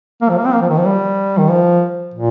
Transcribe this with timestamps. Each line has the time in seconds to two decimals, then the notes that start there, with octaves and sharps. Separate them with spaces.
0.22 A#3
0.29 F3
0.38 A#3
0.45 C4
0.53 A#3
0.62 F3
0.69 D#3
0.78 F3
0.86 G3
1.38 D#3
1.50 F3
2.14 A#2